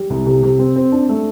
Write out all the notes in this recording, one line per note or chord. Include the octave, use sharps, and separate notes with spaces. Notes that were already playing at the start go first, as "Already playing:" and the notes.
Already playing: G3
C2
C3
C3
C4
C4
D4
A3